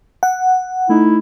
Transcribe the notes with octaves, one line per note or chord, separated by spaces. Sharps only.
F#5
A3 D#4 E4